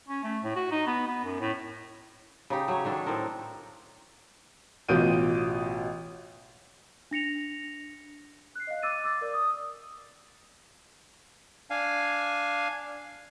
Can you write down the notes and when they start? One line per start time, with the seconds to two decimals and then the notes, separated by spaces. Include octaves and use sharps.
0.08 C#4
0.24 A3
0.44 A2
0.56 F#4
0.72 D#4
0.87 B3
1.07 B3
1.24 F#2
1.40 A2
2.50 C#3 D#4 G4
2.68 F#3 C#5
2.85 D#3 D4 A4
3.06 A2 C4 A4 A#4
4.89 A1 B2 F4 G6 D7 D#7
7.11 D4 A#6 C#7 F7
8.55 F#6 C7
8.67 D#5 F5
8.83 D6 E6 A6 D#7
9.04 D6 E6 A6
9.21 A#4 D5
9.34 D#6
11.70 D4 F5 G#5